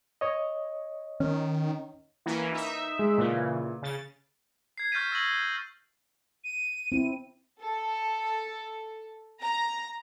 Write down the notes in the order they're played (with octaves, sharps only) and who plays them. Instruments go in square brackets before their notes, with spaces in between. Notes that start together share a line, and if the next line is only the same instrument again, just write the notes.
[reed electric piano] C#5 D#5
[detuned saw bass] D#3 [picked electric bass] C#4
[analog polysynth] E3 A#3 C#4
D#4 E5
[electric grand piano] G#3
[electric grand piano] A#2 [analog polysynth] C#3 E3
[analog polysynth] C#3 A6
[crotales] G#6 C7
C#6 F6 G6 A6 B6 D#7
C#6 E6 A#6 D#7 F#7
[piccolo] D#7
[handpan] C4 E4
[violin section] A4
A#5